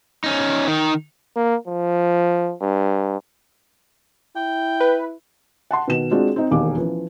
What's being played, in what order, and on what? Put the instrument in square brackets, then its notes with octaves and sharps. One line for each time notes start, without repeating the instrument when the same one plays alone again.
[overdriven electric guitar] C#4 D#4
D#3 D#4
[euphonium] A#3
F3
G2
[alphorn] E4 [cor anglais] G5
[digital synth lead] B4
[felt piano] F#5 A5 C6
B2 D#3 E7
G#3 C4 D4 F4 F#4 G#4
C4 D#4
E1 D#2 D#3 D6
E3 F3 C#4